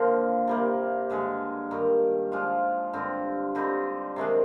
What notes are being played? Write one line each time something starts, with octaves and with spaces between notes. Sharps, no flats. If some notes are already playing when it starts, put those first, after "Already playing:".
Already playing: D3 F3 A#3 C4
C3 G3 A#3
G2 D3 G#3
G2 D#3 G3
F3 G#3 D4 F4
G2 D3 G3 C4
D3 G3 C4 D#4
C3 D#3 G#3 D4